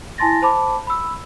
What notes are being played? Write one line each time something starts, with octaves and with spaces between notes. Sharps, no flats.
E4 G#5 A5 C6 A6 A#6
C5 A5 B5 D6
B5 E6